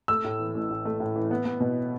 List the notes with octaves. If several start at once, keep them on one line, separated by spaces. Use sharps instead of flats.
A3 E6
A2
E3
A1
A2
A3
A2
E3
B3
B3
B2